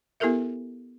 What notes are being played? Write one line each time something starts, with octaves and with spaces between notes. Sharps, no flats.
B3 E4 G4 A4 A#4 E5